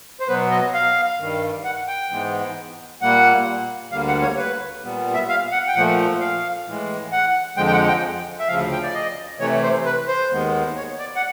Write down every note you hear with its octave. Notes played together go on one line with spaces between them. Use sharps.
C5
B2 F#3 B3 B4
D#5
F5
G2 D#3 G3
F#5
G5
G#2 E3 G#3 B3
A#2 G3 A#3 F#5
D2 D3 G3 A#3 F5
F#5
C#5
B4
A#2 G3 B3
E5
F5
F#5
G5
A#2 F3 A3 F#5
F5
A2 E3 G#3
F#5
F2 D3 F3 G#3 G5
G5
F#5
G5
E5
D2 C#3 F3 F5
G5
D5
D#5
C3 E3 A3 C#5
C5
B4
C5
D#2 D#3 G#3 B3
C#5
D5
F#5